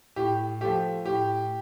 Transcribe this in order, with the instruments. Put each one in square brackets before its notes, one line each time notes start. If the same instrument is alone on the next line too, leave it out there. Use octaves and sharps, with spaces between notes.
[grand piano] A2 G4
F3 A3 G4
A2 G4